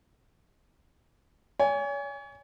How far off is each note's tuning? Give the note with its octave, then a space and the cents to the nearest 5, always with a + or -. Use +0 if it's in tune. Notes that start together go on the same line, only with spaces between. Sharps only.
C#5 +40 G#5 -15